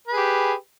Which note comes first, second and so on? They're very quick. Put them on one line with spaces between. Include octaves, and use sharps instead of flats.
B4 G#4 G4